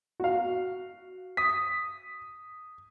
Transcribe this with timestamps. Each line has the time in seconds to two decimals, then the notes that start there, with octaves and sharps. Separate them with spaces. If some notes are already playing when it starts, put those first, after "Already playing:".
0.20 F#4 F5
1.37 D#6 B6